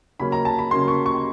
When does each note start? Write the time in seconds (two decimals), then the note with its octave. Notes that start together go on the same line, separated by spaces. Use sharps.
0.20 C#3 F#3 A#3 C#4 B5
0.32 A#5
0.45 A5
0.59 B5
0.71 C#3 F#3 A#3 C#4 C6
0.88 C#6
1.06 C#6